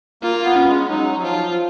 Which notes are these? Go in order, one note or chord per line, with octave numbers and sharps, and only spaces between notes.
A#3 F4
B3
C#4
G#3
F#3 D#4
F#3
F3 F4